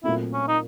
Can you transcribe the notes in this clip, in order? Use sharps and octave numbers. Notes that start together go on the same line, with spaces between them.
A#2 F#3 A3 C4 E4
C#4
D#4